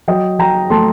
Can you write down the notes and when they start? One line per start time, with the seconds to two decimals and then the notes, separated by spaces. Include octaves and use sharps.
0.08 F#3 D#5 G5
0.39 F#3 G5 A#5
0.70 A3 A5 C6